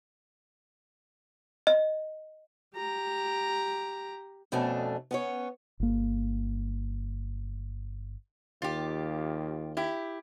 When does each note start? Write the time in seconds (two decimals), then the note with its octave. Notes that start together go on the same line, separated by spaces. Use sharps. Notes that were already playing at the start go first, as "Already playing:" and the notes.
1.67 D#5
2.75 G4 A#5
4.52 F2 B2 A3 C#4 D4
5.11 B3 C#4 C#5
5.80 G1 A#3
8.62 D#2 F4 G4
9.77 E4 G4